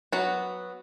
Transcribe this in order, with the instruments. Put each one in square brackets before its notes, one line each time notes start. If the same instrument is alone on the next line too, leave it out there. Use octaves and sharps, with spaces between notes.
[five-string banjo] F#3 B3 F#4